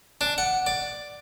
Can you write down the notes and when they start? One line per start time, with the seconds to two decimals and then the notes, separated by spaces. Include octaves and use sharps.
0.21 D4
0.38 F#5
0.66 D5